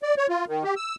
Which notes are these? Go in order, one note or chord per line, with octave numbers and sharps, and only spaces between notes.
D5
C#5
F4
D#3
G4
E6